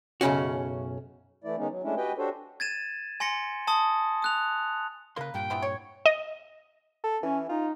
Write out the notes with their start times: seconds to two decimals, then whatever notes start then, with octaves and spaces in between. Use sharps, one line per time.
0.21 B1 F#2 C#3 C#4 F#4
1.44 E3 A3 E4 D5
1.57 D#3 G#3 B3 C#4 D#4
1.70 F#3
1.83 G#3 A3 C#4 D4 E4
1.97 F#4 G4 B4 D#5 G5 G#5
2.18 D4 F#4 G4 A4 C5 C#5
2.60 G#6 A6 D#7 E7
3.20 G#5 C6 A#6 C#7
3.67 A5 C6 D#6
4.22 D#6 F#6 F7
5.16 C#3 A#3 A#4 B4 C6
5.34 G2 A#2 G3 G5
5.50 E3 B3 C4
5.62 C#5
6.06 D#5
7.04 A4
7.23 E3 C#4
7.49 D#4 F4